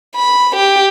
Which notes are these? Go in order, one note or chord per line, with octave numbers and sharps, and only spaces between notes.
B5
G4